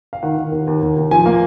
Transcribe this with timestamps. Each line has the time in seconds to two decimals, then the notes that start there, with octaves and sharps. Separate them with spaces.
0.13 F5
0.23 D#3 F#5
0.37 D#3
0.52 D#2
0.67 D#2
0.82 D#2
0.96 D#2
1.11 F3 G#5
1.26 A#3